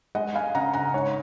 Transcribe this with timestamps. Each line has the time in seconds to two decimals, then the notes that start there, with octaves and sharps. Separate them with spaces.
0.15 G#3 D#5 F#5
0.35 F5 G#5
0.55 C#3 F#5 A#5
0.74 F#5 A#5
0.93 G#2 C#5